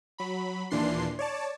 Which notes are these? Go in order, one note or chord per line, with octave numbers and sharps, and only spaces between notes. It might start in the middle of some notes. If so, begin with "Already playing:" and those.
F#3 B5
D#2 A#2 E3 D4 C6 C7
C#5 D5 A5